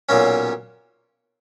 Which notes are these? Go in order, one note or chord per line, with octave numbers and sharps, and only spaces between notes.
B1 A#2 A#3 C#4